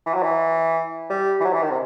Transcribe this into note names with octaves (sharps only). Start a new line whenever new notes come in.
E3
F#3
E3
G3
E3
F#3
E3
D#3
C3